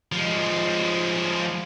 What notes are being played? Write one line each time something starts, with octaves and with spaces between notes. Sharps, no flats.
F3 G#3